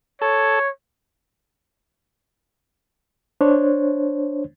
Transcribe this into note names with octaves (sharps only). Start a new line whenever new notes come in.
A4 C#5
D4 C5 C#5